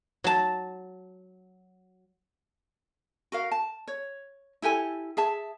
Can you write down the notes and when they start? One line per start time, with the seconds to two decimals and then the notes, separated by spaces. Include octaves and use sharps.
0.24 F#3 A5
3.32 F#4 A#4 F5
3.52 A5
3.88 C#5
4.62 E4 G4 A4 G#5
5.17 G#4 E5 A5